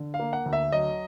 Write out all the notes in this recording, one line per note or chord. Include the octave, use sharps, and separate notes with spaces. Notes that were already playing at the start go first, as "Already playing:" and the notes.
Already playing: D3
F5
A#3
F#5
D2
E5
F#3 D#5